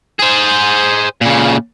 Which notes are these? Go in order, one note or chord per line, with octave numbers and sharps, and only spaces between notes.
G#4 C5
A#2 C#3